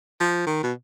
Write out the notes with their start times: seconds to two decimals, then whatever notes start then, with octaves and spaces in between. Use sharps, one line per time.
0.20 F3
0.47 D#3
0.63 B2